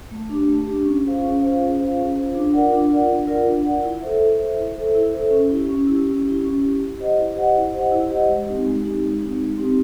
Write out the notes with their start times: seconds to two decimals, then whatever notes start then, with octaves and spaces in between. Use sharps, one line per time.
0.11 A3
0.29 D4 G4
0.48 A3
0.67 D4 G4
0.85 C#4
1.04 F4 G#4 C5 F5
1.22 C#4
1.41 F4 G#4 C5 F5
1.61 C#4
1.79 F4 G#4 C5 F5
1.97 C#4
2.16 F4 G#4 C5 F5
2.35 D4
2.53 F4 A#4 D5 F#5
2.72 D4
2.89 F4 A#4 D5 F#5
3.08 D4
3.27 F4 A#4 D5 F#5
3.45 D4
3.64 F4 A#4 D5 F#5
3.83 E4
4.01 A4 C5 E5
4.20 E4
4.38 A4 C5 E5
4.57 E4
4.76 A4 C5 E5
4.95 E4
5.13 A4 C5 E5
5.31 C#4
5.51 E4 G4
5.69 C#4
5.87 E4 G4
6.06 C#4
6.25 E4 G4
6.43 C#4
6.61 E4 G4
6.80 E4
6.98 G4 C5 D#5 F#5
7.17 E4
7.36 G4 C5 D#5 F#5
7.55 E4
7.73 G4 C5 D#5 F#5
7.92 E4
8.10 G4 C5 D#5 F#5
8.29 G#3
8.47 C4 D#4 G4
8.66 G#3
8.84 C4 D#4 G4
9.03 G#3
9.21 C4 D#4 G4
9.40 G#3
9.58 C4 D#4 G4